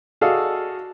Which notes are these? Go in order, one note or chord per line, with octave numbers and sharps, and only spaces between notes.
F#4 G#4 A4 D5 D#5 F5